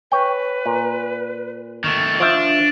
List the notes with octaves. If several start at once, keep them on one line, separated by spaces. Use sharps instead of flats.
B4 C#5 G5
A#2
D#3 A3 C#6
F3 D4 E5